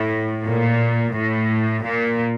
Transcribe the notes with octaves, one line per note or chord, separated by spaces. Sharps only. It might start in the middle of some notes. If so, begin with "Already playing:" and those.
Already playing: A2
A#2
A2
A#2